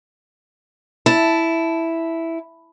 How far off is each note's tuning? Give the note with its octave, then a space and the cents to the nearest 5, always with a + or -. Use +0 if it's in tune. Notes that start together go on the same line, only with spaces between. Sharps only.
E4 +0 A5 +0